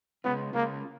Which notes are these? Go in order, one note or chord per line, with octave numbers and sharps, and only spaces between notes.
C#3 G#3 B3 C#4 F4
C#3 G#3 A#3 C#4 F4